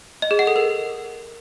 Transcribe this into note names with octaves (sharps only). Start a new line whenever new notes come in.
D#5
G#4
F#5
A4
A#4